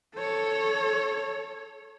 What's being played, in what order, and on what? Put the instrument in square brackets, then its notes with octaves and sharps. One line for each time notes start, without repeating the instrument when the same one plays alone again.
[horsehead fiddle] A4 C#5